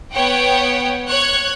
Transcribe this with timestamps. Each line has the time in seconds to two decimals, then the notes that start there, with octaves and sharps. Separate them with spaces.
0.13 B3 C#5 F#5 G5
1.08 C#5 F#6 G#6